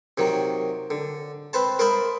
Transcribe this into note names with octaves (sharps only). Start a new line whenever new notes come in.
C3 D#3 F#3
D3
C4 B4 C5 A5
A#4 C5 D#5 E5 A5 B5